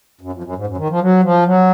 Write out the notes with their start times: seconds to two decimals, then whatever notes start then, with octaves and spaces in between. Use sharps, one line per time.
0.21 F#2
0.32 F2
0.44 F#2
0.56 G#2
0.67 F#2
0.78 D#3
0.90 F3
1.01 F#3
1.23 F3
1.46 F#3